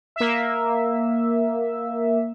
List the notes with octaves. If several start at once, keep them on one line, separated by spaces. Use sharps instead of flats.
A#3 E5